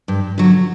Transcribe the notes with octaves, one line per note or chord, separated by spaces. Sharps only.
G2
D3 F#3